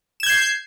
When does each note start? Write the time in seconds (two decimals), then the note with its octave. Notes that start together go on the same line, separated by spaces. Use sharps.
0.20 E7
0.23 G#6
0.26 G6
0.30 C7